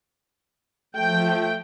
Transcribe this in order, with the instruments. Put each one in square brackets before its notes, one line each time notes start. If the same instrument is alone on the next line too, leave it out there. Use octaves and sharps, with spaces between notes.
[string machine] F3 [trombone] A3 [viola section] G5